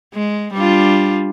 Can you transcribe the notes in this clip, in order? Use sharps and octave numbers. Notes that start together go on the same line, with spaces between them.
G#3
G3 D4 F4